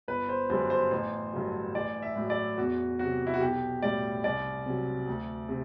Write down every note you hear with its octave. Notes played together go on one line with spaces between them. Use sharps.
G1 B4
C5
F#2 D3 G3 C5
C5
A1 C5
G2 D3 F#3
A1 D5
E5
A2 F#3
D5
E2 F#4
C3 F#3 F#4
E4
F#4
B1 G4
A2 G3 D5
C2 D5
C3 F#3
D2
C3